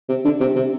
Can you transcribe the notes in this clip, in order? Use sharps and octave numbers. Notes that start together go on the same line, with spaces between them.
C3
D3
C3
C3